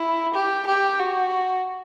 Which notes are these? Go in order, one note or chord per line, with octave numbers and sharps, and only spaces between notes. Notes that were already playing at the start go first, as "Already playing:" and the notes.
Already playing: E4
G4
G4
F#4